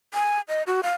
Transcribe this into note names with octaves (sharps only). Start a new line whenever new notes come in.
G#5
D#5
F#4
F5